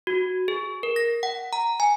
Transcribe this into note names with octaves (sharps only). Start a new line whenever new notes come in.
F#4
G#4
A#4
A#6
F#5
A#5
G#5